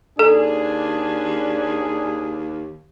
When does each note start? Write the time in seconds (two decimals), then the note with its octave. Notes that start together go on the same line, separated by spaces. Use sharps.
0.19 D#2 D4 G#4 A4